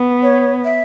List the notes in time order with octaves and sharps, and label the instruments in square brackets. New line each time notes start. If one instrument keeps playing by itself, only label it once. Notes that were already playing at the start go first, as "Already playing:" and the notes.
Already playing: [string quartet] B3
[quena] C#5
E5